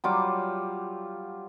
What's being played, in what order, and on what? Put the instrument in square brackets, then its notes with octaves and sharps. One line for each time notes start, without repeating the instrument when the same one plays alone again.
[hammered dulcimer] F#3 G3 F4 D6